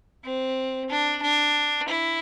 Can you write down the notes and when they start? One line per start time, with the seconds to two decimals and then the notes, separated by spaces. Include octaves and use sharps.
0.24 C4
0.90 D4
1.22 D4
1.88 E4